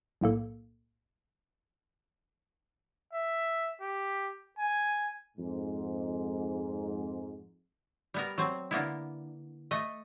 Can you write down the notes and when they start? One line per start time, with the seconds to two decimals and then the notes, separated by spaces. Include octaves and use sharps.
0.21 B1 A2 A#3 A4
3.13 E5
3.81 G4
4.59 G#5
5.37 F2 G#2
8.14 G3 B3 A#4
8.38 F#3 C4
8.71 D3 A#3 B3 E4
9.71 A3 D#5